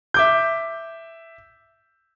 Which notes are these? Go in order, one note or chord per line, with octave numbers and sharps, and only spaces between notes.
E5 D6 G6